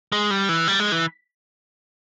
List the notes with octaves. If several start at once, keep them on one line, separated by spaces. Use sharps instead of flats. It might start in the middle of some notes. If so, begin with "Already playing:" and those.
G#3
G3
E3
G3
G#3
E3